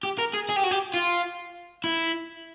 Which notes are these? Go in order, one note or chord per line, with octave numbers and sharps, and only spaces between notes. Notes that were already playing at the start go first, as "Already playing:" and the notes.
G4
A#4
G#4
G#4
G4
F#4
G4
F4
E4